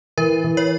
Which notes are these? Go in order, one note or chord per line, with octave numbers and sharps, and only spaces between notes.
E3 A#4
E3
C#5